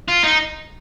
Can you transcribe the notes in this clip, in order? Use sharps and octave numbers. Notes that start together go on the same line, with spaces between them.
F4
D#4